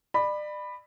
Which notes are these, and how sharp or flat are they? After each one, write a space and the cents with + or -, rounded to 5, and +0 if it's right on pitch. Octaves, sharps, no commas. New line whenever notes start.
D5 +35 B5 +0